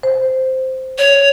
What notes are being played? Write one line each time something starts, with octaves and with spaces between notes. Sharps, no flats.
C5
C#5